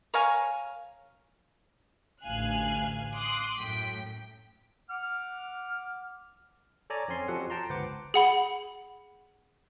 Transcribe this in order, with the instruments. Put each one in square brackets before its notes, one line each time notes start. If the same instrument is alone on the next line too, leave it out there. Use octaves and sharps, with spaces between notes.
[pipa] A#4 C#5 F5 G#5
[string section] A1 D2 F5 G#5 F#6
C6 D6 D#6 F#6
F#2 A2 G5 B6
[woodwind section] F#5 D6 F6
[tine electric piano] A4 C#5 D5 G#5 A#5
F2 C4 C#4 G#5 C6 C7
F2 F3 F#4 G4 A4 F#5
G5 A5 A#5 C6
G1 C#2 B4 C5 F#5 D6
[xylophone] G#4 F#5 B5